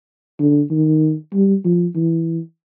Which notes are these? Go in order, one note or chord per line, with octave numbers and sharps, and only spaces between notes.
D3
D#3
G3
F3
E3